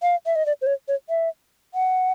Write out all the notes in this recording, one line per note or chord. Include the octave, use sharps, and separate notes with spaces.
F5
E5
D#5
D5
C5
C#5
C#5
E5
F#5